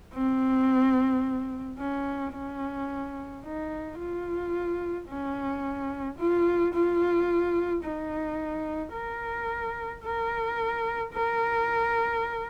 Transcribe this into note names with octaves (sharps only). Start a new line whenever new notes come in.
C4
C#4
C#4
D#4
F4
C#4
F4
F4
D#4
A#4
A#4
A#4